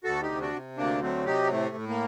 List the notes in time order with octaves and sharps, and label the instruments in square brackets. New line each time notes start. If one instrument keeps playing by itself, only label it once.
[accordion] D2 F#4 A4
D#4 G4
C3
D4 F#4
C3
D2 A#3 D4
F#3 A3 C4
C3 D#4 G4
A2 A3
A2
A#3